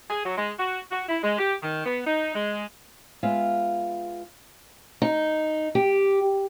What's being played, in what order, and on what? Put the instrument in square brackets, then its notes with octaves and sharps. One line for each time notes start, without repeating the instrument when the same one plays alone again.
[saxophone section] G#4
F#3
G#3
F#4
F#4
E4
G#3
G4
D#3
B3
D#4
G#3
[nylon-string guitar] G#3 B3 F4 E5 F5
[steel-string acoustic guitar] D#4
G4